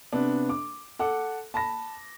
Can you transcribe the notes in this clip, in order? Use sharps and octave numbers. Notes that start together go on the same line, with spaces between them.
C3 B3 D4
D6
A4 F#5 D6
A5 B5 A#6